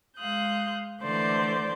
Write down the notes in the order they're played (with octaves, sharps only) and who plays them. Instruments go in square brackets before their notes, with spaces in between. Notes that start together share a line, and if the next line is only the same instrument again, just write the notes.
[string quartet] G#3 F5 C6 D#6 F#6 G6
D3 E3 A3 C5 D5 G6